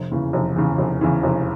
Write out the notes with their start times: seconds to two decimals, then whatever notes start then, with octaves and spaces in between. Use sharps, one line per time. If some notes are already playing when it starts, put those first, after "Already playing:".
Already playing: F1
0.11 E2 C#3 E3
0.33 F1
0.56 E2 C#3 E3
0.78 F1
1.01 E2 C#3 E3
1.23 F1